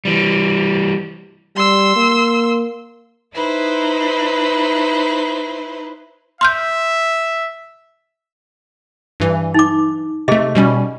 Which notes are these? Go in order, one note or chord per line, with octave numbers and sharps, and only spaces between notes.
E3 G3
G3 C6 E6
A#3
D#4 E4 B4 C5
E5 C6 F6 G6
G2 E3
D#4 D6
C3 A3 G#4 D#5
B2 G3 C#4